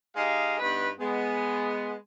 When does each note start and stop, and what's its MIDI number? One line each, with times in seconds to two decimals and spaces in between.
0.15 0.56 56
0.15 0.56 63
0.15 0.56 67
0.15 0.56 68
0.15 0.56 75
0.15 0.56 77
0.59 0.89 43
0.59 0.89 59
0.59 0.89 63
0.59 0.89 71
0.99 1.94 56
0.99 1.94 59